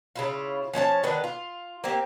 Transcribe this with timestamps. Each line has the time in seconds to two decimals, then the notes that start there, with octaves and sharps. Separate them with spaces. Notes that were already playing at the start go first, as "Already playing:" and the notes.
0.16 C#3 E4 F4
0.74 F3 C#4 C#5 A5
1.03 D3 D#3 B3 D4
1.24 F4
1.84 A#3 C4 G4